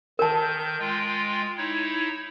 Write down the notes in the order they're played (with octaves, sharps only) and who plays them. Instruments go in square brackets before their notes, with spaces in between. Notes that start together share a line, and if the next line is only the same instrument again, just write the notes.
[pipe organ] D#3 G6 [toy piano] A#4 A5
[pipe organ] G#3 F4 G5
D#4 E4 C#5